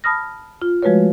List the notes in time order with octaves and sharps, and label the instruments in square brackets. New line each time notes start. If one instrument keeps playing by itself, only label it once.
[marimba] A5 B5 D#6 F6 A#6
F4
F3 G#3 A3 F#4 B4 C#5